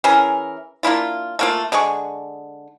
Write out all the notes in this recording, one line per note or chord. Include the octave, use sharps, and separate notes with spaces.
E3 C#4 G#4 A#4
A#3 D4 E4 F4
A3 A#3 F4
D3 G#3 G#4 C#6